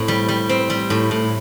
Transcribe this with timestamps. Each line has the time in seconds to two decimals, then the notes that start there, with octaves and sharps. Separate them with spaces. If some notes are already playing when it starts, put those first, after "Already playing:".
Already playing: A2 C4
0.08 G3
0.28 G3
0.49 C4
0.70 G3
0.90 A2
1.11 A2